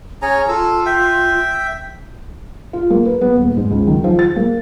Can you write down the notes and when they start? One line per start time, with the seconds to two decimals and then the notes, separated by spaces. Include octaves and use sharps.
0.22 C#4 G#4 C#5 A#5
0.48 F4 A4
0.86 E5 G5
2.73 F4
2.90 A#3
3.05 B4
3.21 B3
3.37 D#1
3.57 G#2
3.71 C#2
3.87 D#3
4.04 F3
4.19 A6
4.36 A#3